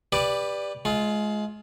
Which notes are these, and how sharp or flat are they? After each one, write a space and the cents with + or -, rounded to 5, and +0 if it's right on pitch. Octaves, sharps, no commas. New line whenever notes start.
G4 +20 B4 +0 D5 +0
G#3 +25 F4 +0